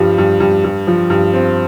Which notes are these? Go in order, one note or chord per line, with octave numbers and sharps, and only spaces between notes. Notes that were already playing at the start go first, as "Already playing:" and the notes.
Already playing: G2 F3 G3
G2
G2
G2
F3
G2
C4